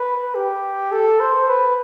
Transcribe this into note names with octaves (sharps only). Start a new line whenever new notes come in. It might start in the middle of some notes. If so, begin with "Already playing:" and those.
Already playing: B4
G4
A4
C5
B4